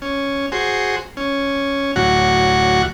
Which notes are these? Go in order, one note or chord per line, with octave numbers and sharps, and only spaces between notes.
C#4
F#4 G#4 C5
C#4
D2 A2 F#3 F#4 F#5